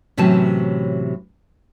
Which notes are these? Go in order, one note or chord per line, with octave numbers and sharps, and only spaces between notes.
A2 C3 E3 F#3 C#4 A5